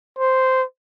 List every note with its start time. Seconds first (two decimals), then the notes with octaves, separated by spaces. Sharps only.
0.18 C5